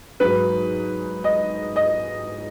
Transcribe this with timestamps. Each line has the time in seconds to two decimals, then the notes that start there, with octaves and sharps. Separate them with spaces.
0.20 G#2 F#3 B4
1.24 D#5
1.76 D#5